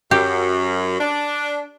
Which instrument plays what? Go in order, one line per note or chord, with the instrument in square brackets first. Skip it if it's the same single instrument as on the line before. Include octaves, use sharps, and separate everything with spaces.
[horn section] F#2 [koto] G4
[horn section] D4